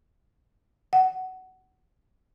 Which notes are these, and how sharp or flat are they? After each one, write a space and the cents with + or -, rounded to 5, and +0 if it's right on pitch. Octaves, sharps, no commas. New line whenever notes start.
F#5 +15